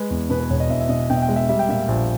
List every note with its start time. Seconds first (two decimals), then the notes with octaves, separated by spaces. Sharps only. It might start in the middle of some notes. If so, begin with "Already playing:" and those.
Already playing: G#3 B4
0.11 E2
0.30 B2 B4
0.40 B4
0.50 E1 C#5
0.60 D#5
0.69 E2 E5
0.81 E5
0.89 B2 D#5
1.10 B2 G5
1.16 E5
1.22 G5
1.29 G#3
1.36 E5
1.49 G3 E5
1.59 G5
1.69 A#2 E5
1.88 A#1